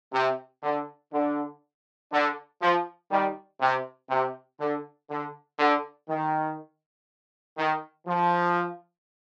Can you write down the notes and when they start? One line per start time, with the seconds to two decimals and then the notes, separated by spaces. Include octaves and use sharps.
0.13 C3
0.63 D3
1.13 D3
2.12 D3
2.61 F3
3.11 D#3 G3
3.61 C3
4.10 C3
4.60 D3
5.10 D3
5.59 D3
6.09 D#3
7.58 D#3
8.07 F3